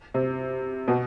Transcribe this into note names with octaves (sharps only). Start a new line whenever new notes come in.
C3
B2